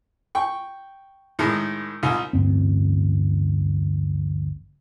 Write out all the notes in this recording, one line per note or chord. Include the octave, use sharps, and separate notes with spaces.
G5 C#6
A2 D#3 G#3 A#4
C2 D#4 F4 F5
A1 D2 G2 C4